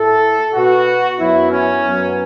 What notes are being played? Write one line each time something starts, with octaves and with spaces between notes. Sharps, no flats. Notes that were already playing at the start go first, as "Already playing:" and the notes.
Already playing: A2 A3 A4
B2 B3 F#4
F#2 F#3 B3 E4
C#4
F#2 F#3 B3